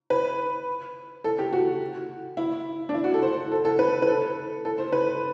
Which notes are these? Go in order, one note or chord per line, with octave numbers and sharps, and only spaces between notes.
B4
A4
G4
F#4
E4
D4
E4
F#4
A4
C5
A4
A4
B4
B4
A4
A4
C5
B4